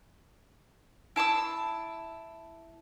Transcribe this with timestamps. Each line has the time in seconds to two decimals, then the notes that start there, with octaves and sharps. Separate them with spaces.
1.16 E4 A5 C6 E6